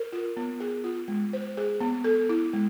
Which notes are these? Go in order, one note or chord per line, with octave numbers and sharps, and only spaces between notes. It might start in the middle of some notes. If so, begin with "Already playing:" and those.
Already playing: A#4
F4
B3
G#4
F4
G#3
C5
G#4
B3
A4
E4
G#3